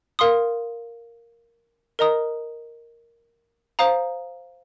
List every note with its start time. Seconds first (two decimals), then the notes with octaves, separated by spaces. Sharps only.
0.19 A#4 F5 C6 D#6
1.99 A#4 D#5 A#5 D#6
3.79 C5 F5 A#5 D#6